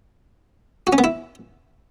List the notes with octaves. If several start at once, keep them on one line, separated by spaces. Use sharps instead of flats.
F#4
C#4
B3
E4